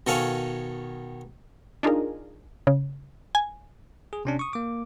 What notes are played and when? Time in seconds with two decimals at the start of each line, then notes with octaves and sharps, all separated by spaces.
0.07 B2 D#3 A4 C#5 F5 G#5
1.83 D4 D#4 F4 G#4 A#4
2.67 C#3
3.35 G#5
4.13 G#4
4.25 C3 C#4 D4
4.39 C#6 D#6
4.53 A#3 D6